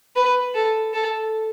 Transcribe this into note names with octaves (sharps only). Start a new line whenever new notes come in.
B4
A4
A4